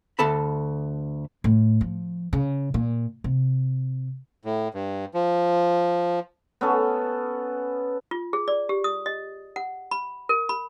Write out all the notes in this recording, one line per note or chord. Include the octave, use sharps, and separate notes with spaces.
D2 A4 A5 B5
A2
F3
C#3
A#2
C3
A2
G2
F3
B3 C#4 A4
F4
G#4
D5
G4
D#6
D#5
F#5
B5
A#4
B5